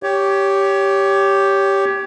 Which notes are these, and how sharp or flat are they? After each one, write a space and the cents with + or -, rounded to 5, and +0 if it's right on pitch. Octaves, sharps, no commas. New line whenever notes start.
G4 +0 C#5 +20